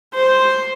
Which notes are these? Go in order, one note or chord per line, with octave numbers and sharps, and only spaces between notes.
C5